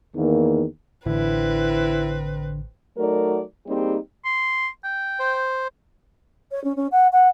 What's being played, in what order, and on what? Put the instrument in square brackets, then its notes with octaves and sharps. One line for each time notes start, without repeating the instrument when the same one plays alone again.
[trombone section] E2 D#3 A#3
[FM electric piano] A1 [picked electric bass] D3 D4 [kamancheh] C4 B4 [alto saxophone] E4
[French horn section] F#3 A3 D#4 F#4 A#4 D5
G3 A#3 C4 D#4 G4 G#4
[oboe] C6
G5
[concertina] C5
[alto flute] C#5
C#4
C#4
F#5
F#5